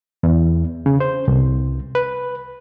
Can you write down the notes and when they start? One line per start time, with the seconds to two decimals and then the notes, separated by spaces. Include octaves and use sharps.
0.23 E2
0.86 C#3
1.00 C5
1.28 C2
1.95 B4